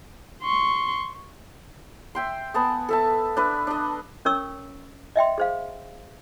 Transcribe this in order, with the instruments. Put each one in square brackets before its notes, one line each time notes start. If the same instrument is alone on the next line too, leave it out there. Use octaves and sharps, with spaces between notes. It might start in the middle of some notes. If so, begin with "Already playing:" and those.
[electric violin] C6 C#6
[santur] E5 G5 C6
B3 G#5 A5 D#6
A4 E5 A5
D4 B4 E5
D4 D#5
[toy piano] C#4 A#4 C#5 C#6 E6
D#5 E5 G5 C6
G#4 C5 F5